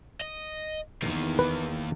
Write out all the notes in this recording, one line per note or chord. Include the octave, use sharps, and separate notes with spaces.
D#5
E2 D#3 A#3
B4